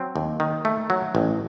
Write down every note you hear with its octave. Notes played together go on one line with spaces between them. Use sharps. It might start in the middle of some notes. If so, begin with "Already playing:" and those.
Already playing: F#3 C4
D#2
D#3
A3
F#3
A1